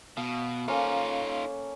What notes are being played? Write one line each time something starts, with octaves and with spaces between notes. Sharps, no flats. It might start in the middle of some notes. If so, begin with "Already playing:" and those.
B2 F5
A#3 C#4 D#4 F4 A4